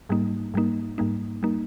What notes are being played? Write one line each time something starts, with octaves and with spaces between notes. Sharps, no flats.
G#2 G3 A#3 D#4
G#2 G3 A#3 D#4
G#2 G3 A#3 D#4
G3 A#3 D#4